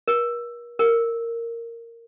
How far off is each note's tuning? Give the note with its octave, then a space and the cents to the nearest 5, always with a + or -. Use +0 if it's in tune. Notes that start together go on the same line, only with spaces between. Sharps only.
A#4 +40
A#4 -10